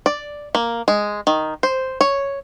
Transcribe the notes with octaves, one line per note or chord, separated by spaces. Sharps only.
D5
A#3
G#3
D#3
C5
C#5